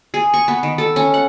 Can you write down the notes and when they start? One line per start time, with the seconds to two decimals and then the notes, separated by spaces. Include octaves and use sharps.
0.14 G#4
0.34 C#6
0.48 B3
0.63 D#3
0.78 A4
0.96 C#4
1.14 F#5